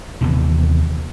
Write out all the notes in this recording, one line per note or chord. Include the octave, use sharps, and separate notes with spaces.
D#2 C3 E3 B3